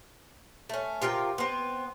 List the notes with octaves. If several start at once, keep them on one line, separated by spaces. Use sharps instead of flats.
A3 C#4
C3 F4 A#4 G5
B3 C4